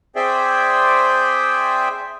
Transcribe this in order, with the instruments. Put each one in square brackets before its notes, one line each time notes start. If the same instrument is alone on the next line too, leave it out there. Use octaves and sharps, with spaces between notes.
[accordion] C4 G#4 C5 D5 E5 G5